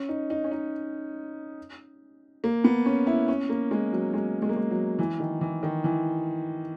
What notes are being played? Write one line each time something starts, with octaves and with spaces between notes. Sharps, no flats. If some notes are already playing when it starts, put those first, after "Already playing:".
Already playing: C#4
D#4
D#4
C#4
D#4
A#3
B3
C#4
E4
C#4
A#3
G#3
F#3
G#3
G#3
A#3
G#3
F#3
E3
D#3
E3
D#3
E3